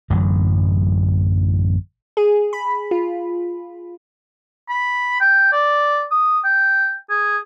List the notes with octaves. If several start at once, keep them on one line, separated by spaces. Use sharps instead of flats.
A1 F#2 D3 F#3
G#4
B5
F4
B5
G5
D5
D#6
G5
G#4